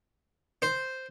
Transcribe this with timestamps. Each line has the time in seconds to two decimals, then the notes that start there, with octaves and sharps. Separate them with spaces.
0.62 C5